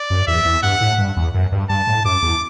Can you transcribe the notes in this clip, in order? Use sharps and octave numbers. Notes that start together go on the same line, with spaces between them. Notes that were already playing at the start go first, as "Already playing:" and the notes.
Already playing: D5
F#2
E2 E5
E2
G2 F#5
A2
G2
E2
F#2
G2
G2 A5
A2
F#2 D6
E2